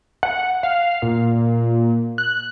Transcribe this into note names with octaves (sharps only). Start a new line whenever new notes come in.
F#5
F5
A#2
F#6